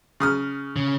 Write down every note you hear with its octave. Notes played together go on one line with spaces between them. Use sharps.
C#3 D#6 F6
C#3